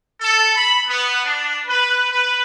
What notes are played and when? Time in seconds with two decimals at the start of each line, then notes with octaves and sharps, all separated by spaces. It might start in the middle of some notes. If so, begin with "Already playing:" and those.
0.20 A4
0.55 B5
0.87 B3
1.23 D4
1.66 B4
2.10 B4